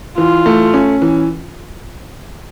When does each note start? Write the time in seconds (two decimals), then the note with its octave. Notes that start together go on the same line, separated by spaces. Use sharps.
0.18 E3 F4
0.46 A3
0.74 C#4
1.02 E3